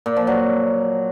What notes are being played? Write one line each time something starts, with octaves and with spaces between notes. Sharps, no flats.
A#2
F3
F#3